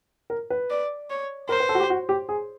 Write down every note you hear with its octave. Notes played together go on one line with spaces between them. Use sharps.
A#4
B4
D5
C#5
A#4 C5
B4
A4
F#4
G4
F#4
G4
G#4